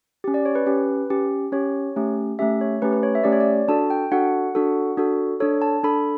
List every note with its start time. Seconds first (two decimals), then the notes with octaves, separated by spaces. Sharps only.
0.24 C#4 G4
0.34 D5
0.45 C#5
0.55 B4
0.66 C#4 G4
1.10 C#4 G4
1.52 C#4 G4 C#5
1.96 A3 C#4 G4
2.39 A3 C#4 G4 E5
2.61 C#5
2.82 A3 C#4 G4 B4
2.93 B4
3.03 C#5
3.15 E5
3.23 A3 C#4 G4 D5
3.32 C#5
3.40 D5
3.68 D4 F#4 A4 A5
3.90 G5
4.12 D4 F#4 A4 F#5
4.55 D4 F#4 A4
4.97 D4 F#4 A4
5.40 D4 A4 C#5
5.62 A5
5.83 D4 A4 B5